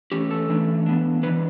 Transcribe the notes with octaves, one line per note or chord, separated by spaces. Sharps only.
E3 A3 C#4 G4
A4
E3 A3 D4
E3 B3 D4
E3 G3 D4 B4